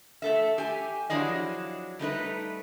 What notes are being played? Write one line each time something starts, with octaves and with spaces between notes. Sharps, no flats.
A3 A4 E5
G4 G#5
F3 F#3 D4 E4 G#4 D#5
G3 A3 D#4 B4